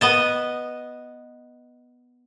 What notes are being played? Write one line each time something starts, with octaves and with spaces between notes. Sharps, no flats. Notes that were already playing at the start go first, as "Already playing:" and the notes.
B3 D#5 A5